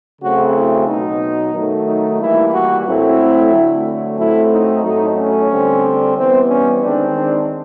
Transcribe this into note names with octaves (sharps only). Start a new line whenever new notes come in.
C#3 F#3 A3 C4 F#4
E4
B2 F#3 B3 D#4
D#3 F#3 A3
D#4
E3 G3 A#3 E4
F#4
A2 F#3 A3 C4 E4
D3 F#3 A3
A2 F#3 A3 C4 E4
D#4
A2 F#3 A3 D#4
C#4
D3 G3 C4
E3 G3 B3 C4
C#4
D#3 G#3 C4 D4
D4